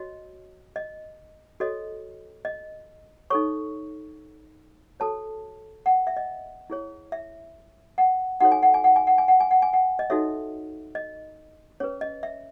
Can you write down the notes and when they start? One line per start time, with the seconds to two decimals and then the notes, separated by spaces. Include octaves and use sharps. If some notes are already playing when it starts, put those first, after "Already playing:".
Already playing: F#4 C#5 D#5
0.76 D#5
1.60 F#4 A4 C#5 D#5
2.45 D#5
3.30 D#4 A4 C#5 C#6
5.00 F#4 A4 C#5 A5
5.86 F#5
6.07 E5
6.17 D#5
6.70 E4 G#4 C#5
7.12 E5
7.98 F#5
8.40 D#4 F#4 A4 C#5 F#5
8.52 G#5
8.63 F#5
8.74 G#5
8.84 F#5
8.96 G#5
9.07 F#5
9.18 G#5
9.28 F#5
9.40 G#5
9.51 F#5
9.62 G#5
9.73 F#5
9.99 D#5
10.10 D#4 F#4 A4 C#5 E5
10.95 D#5
11.80 C#4 G#4 B4 C#5
12.01 D#5
12.23 E5